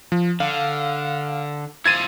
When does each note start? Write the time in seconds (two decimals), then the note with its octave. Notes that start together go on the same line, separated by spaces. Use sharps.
0.12 F3
0.40 D3 F5
1.86 E4 F4 C5 G#6 A6 D#7